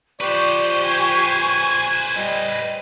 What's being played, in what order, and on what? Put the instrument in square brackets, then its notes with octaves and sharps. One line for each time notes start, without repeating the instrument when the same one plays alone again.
[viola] F3 G4 [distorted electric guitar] B4 C5 [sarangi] D5 [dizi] C#6
[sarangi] G#5
[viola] G3 [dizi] D#5